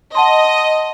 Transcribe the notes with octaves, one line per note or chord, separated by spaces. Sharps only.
D#5 F#5 A5 C6